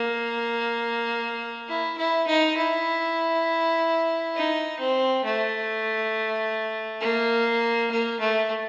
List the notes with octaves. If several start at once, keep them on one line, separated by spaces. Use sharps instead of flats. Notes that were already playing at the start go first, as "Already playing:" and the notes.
Already playing: A#3
E4
E4
D#4
E4
D#4
C4
A3
A#3
A#3
A3